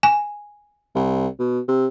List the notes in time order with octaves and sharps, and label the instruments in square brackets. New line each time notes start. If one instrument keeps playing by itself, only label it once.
[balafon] G#5
[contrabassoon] C2
B2
C3